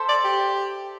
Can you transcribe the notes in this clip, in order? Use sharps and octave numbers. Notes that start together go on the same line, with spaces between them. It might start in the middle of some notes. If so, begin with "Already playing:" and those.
Already playing: A4 C5 E5
D5
G4